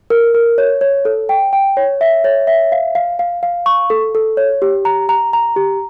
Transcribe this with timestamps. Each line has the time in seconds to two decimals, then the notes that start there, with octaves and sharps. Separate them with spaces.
0.10 A#4
0.34 A#4
0.58 C#5
0.81 C#5
1.05 A4
1.29 G5
1.53 G5
1.77 C#5
2.01 E5
2.24 C#5
2.47 E5
2.72 F5
2.95 F5
3.19 F5
3.43 F5
3.66 C#6
3.90 A4
4.15 A4
4.37 C#5
4.62 G4
4.85 A#5
5.09 A#5
5.33 A#5
5.56 G4